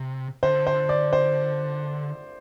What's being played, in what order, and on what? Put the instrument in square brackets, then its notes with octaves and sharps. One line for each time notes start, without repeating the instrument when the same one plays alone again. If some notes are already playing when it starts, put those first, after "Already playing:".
Already playing: [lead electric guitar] C3
[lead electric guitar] D3 [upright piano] C5
[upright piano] C5
D5
C5